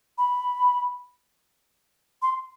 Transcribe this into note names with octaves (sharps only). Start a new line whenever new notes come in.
B5
C6